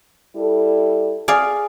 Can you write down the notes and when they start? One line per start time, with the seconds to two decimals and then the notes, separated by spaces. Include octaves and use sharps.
0.36 G3 E4 A4
1.28 G#4 D5 F5